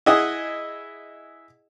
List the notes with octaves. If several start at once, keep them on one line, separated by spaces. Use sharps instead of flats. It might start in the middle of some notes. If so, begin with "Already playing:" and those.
E4 G#4 D#5 F#5 D#6